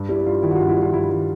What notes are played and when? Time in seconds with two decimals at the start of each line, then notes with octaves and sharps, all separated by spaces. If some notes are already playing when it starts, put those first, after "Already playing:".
Already playing: G2
0.09 G3 E4
0.26 G2 F4
0.42 D#3 E4
0.51 F#4
0.55 F4
0.60 G2
0.68 E4
0.77 G3 F4
0.93 G2 E4
1.10 D#3 E4